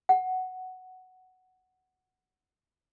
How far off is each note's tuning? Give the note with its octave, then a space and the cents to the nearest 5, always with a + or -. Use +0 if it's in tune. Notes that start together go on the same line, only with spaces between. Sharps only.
F#5 +5